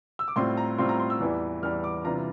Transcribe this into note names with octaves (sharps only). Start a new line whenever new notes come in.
E6
D6
A2 G3 C4 F4 C6
A#5
A2 G3 C4 F4 C6
A#5
C6
E6
E2 E3 G3
E2 E3 G3 F6
D6
C3 E3 G3 D4 F4 A#5